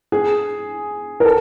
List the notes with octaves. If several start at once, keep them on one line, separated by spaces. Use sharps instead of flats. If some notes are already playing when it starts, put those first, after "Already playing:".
G#4
A#4
A4